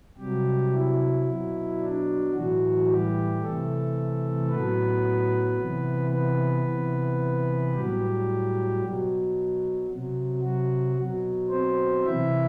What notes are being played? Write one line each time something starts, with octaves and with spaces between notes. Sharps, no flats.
C3 F#3 G3 G4
E4
B2 F#3
D4
A2 E3 F#3 F#4
G3 G4
C3 E3 A3 A4
A2 F#3 B3 B4
C3 E3
B3 B4
C3 E3
A2 F#3 G3 G4
B2 F#3
C3 F#3
F#3 F#4
B2 F#3
C4 C5
C3 E3 E4 E5